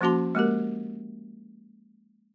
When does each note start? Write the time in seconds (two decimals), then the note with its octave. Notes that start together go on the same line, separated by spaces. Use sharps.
0.01 F3 A#3 C#4 F#4 A5 C6
0.35 G#3 A#3 G4 A#4